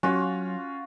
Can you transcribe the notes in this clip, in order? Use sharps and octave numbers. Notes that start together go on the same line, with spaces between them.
F#3 C#4 F4 F#4 G#5 C#6 F#6